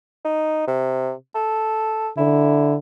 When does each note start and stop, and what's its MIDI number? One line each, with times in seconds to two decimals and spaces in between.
0.25 0.63 63
0.68 1.12 48
1.35 2.09 69
2.17 2.77 50
2.17 2.74 64